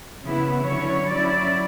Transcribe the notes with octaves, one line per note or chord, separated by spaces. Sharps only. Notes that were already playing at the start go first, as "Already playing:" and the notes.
C#3 E3 B3 E4
D3 F#3 C#4 E4 C#5
F#3 C#4 E4 D5